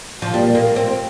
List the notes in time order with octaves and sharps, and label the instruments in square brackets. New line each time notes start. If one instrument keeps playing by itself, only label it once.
[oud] F3
[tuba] A#2 [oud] G3
[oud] A#3
C4